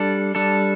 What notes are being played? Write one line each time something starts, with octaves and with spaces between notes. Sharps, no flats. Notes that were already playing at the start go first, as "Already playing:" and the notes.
Already playing: G3 D4 A4
G3 D4 A4